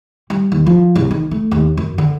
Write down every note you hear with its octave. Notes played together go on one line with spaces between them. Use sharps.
G3
D#2
F3
C2
D#3
A3
D#2
F#2
D3